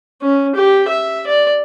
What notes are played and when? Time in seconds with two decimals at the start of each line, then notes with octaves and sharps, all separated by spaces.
0.22 C#4
0.55 G4
0.88 E5
1.27 D5